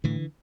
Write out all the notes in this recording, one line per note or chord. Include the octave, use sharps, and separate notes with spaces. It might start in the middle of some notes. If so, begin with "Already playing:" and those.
A2 D3 E3